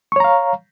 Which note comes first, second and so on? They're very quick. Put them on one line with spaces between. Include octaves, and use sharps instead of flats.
C#6 C#5 A#5 F5